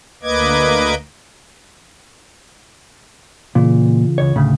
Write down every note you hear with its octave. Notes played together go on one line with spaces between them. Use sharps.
D2 A#3 B4 D#5 D6 G#6
A#2 C#3 E3 F4
C#2 C#5
D2 A2 C#3